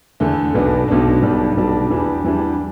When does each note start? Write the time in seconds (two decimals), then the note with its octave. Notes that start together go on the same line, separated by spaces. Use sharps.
0.20 E2 D3 A3
0.54 B1 B2 B3 D4
0.88 B1 B2 B3 D4
1.22 B1 B2 G3 D4
1.57 B1 B2 G3 D4
1.90 E2 E3 G3 D4
2.24 E2 E3 G3 D4